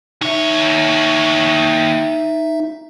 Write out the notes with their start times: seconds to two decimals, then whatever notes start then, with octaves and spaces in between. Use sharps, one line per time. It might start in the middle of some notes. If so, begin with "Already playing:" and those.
0.21 D#2 D#4 C#5 E5